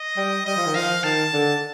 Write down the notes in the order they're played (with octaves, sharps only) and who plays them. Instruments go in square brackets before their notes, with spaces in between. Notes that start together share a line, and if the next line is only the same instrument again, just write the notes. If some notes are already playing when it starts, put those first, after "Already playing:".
Already playing: [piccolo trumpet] D#5
[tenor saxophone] G3
[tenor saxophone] G3 [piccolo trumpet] D#5
[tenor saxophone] F3
D#3
[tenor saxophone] F3 [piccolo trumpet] F5
[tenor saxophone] D#3 [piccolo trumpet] A5
[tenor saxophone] D3